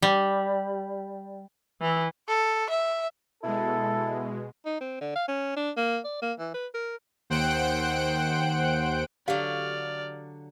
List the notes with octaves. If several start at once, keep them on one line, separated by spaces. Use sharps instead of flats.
G3
E3
A4
E5
B2 G#3 E4 A4
D#4
C4
D3
F5
C#4
D4
A#3
D5
A#3
E3
B4
A#4
D#2 C5 F#5 G5 F#6 D7
D3 F#3 G4 D5 F5 F6